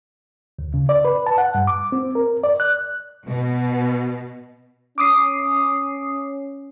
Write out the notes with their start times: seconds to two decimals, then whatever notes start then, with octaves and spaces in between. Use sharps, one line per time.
0.59 D2
0.74 C#3
0.89 D5
1.05 B4
1.26 A5
1.38 F#5
1.55 G2
1.67 D6
1.92 C4
2.15 A#4
2.44 D5
2.60 F#6
3.27 B2
4.98 C#4 D6 D#6 C7